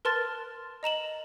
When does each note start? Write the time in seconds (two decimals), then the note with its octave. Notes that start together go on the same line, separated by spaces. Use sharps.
0.05 A#4 B4 A5 C6 F6 A6
0.83 D#5 A#5 E7 F#7